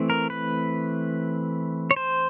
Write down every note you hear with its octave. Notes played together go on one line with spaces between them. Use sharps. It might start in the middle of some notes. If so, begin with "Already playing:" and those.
Already playing: E3 A3 C4
A#4
B4
C#5
C5